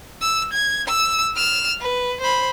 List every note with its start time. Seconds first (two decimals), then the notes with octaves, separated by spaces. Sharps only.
0.21 E6
0.53 G#6
0.88 E6
1.35 F6 E7
1.80 B4
2.20 C5 B5